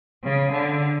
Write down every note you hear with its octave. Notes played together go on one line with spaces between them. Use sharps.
C#3
D3